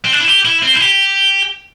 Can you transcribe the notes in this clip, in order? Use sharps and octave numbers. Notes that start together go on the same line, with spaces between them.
C4
D4
E4
G4
E4
C4
E4
G4